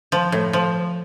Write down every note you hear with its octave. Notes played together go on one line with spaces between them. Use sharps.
F3
A2
F3